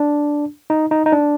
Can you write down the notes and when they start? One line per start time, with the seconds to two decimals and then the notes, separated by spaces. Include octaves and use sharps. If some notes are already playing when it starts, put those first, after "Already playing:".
Already playing: D4
0.70 D#4
0.91 D#4
1.06 D#4
1.12 D4